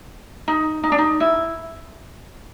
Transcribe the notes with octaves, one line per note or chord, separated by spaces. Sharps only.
D#4
D#4
D4
D#4
E4